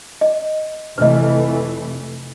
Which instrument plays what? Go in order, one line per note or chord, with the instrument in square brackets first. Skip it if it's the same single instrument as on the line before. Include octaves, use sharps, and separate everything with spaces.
[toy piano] D#5
[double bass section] F1 E3 A3 [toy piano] B4 D#5